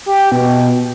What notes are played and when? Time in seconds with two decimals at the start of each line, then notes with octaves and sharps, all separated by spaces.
0.06 G4
0.32 B2